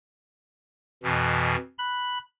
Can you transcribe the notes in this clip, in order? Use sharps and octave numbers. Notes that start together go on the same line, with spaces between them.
F2 B2 E3
B5 F#6